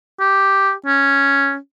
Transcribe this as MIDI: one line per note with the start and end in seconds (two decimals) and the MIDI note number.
0.20 0.72 67
0.86 1.56 61